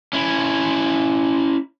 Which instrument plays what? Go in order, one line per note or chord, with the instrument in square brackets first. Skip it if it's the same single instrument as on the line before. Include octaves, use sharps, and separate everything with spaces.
[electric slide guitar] C#4 E4